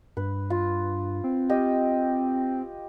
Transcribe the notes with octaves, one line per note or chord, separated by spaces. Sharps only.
G2 B4
F4
C4
G4 D#5 F5